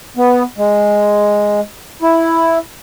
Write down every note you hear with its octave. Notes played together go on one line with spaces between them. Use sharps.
B3
G#3
E4